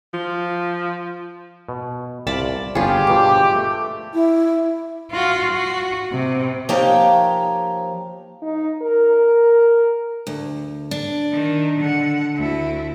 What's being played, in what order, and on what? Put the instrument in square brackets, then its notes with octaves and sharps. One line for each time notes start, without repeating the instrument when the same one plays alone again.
[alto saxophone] F3
[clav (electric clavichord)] B2
[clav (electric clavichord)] C2 F4 [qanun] D5 A5 B5
[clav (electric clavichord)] G1 B3 C#4 [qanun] F4 G#4 [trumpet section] G4
[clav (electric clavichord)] G2 B2 F3 [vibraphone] D6
[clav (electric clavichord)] A3
[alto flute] E4
[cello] F4 F#4
F#4
C3
[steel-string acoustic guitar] F3 A#3 D#4 G4 C#5 G5
[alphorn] D#4
A#4
[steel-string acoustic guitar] D2
D4
[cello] D#3
D3 F#5
D2 E4